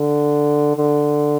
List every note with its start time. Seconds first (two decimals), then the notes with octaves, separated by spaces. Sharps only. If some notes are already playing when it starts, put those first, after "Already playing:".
Already playing: D3
0.77 D3